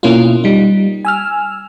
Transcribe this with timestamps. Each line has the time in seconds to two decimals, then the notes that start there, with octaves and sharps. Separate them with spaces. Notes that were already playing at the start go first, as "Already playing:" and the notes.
0.03 B2 A#3 C#4 E4 F4
0.44 G3 D#4
1.05 G#5 E6 F6